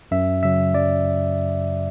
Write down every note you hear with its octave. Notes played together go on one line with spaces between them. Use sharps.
F#2 E5
C#3 F#3 E5
F#2 D5